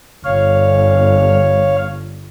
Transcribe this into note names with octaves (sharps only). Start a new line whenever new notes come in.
G1 C#5 F5